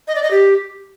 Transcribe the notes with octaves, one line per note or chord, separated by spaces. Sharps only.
D#5
D5
D#5
G4